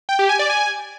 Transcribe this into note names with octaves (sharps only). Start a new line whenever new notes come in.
G5
G4
G#5
D5
G#5